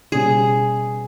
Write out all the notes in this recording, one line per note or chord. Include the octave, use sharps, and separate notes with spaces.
B2 G3 C#4 G#4